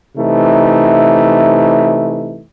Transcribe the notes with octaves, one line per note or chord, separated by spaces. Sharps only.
C3 E3 A3 D#4